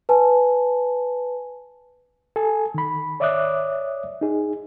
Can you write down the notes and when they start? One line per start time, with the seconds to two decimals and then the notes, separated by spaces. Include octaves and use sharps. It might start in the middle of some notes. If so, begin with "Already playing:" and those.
0.09 B4 G#5 A5
2.36 A4 G#5
2.74 D#3 B5
3.20 C#5 D5 E5 D6 D#6 F#6
4.21 D#4 G#4